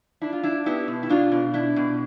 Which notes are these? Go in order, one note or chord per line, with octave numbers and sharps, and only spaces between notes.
D4 E4
F4
D4 E4
B3 E4 G4
B2
E4
B2 D4 F4
B2
D4 E4
B2